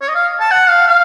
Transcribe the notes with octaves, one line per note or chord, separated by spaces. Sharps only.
C#5
D#5
F5
A5
F#5
F5
F5